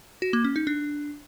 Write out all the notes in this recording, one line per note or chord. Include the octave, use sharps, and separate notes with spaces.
F#4
A#3
C#4
D#4
D4